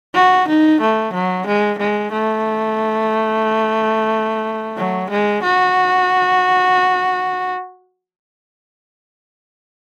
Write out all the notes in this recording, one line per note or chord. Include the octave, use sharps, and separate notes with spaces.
F#4
D#4
A3
F#3
G#3
G#3
A3
F#3
G#3
F#4